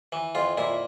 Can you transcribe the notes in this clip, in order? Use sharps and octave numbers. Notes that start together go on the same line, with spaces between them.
E3
F2 F4
A#2 E4